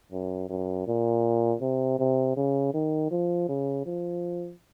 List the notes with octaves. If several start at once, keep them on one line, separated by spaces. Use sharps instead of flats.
F#2
F#2
A#2
C3
C3
C#3
D#3
F3
C#3
F3